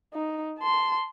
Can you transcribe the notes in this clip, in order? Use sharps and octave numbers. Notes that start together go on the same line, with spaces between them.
D#4
A5 C6